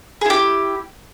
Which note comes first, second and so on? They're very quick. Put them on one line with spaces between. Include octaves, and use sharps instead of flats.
G#4 E4 G4